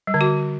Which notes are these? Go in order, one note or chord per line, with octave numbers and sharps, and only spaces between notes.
G3
D3
F#4